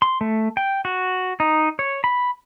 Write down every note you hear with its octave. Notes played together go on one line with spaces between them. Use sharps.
C6
A3
G5
F#4
D#4
C#5
B5